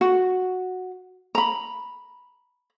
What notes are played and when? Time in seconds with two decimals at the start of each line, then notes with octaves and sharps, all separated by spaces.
0.01 F#4
1.35 A#5 B5